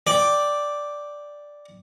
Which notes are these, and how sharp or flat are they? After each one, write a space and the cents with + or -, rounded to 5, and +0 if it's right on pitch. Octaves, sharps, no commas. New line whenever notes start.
D5 +0 G5 +0